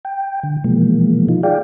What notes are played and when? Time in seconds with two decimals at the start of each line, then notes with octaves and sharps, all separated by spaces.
0.05 G5
0.43 D3
0.64 B2 E3 F3 G#3 A#3
1.29 F3 D#4 F4
1.43 G#4 D5 F5 G5